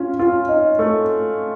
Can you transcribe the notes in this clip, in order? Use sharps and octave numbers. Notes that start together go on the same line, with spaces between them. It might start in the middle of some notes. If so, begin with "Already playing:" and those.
Already playing: C#4 F4
F4
D#4
A3